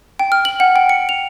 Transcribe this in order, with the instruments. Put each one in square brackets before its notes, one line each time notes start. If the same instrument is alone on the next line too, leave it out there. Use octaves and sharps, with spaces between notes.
[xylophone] G5
F6
F#7
F#5
G5
C#7
F7